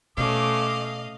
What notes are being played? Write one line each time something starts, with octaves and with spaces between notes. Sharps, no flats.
B2 A3 C#4 D#5 F5 D6